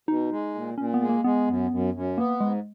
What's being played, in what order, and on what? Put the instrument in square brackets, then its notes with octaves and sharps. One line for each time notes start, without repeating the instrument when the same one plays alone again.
[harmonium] B2 [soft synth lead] D#4
[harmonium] G#3
A#2
[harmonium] A#2 [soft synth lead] C#4
[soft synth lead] B3
[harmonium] G#3
[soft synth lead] A#3
[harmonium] G#3 [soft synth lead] B3
[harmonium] F#2
F#2
F#2
[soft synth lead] A#3 [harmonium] B3
[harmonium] G#2 [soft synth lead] G#3